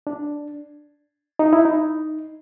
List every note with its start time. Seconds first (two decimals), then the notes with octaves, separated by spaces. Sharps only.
0.07 D4
1.39 D#4
1.53 E4
1.65 D#4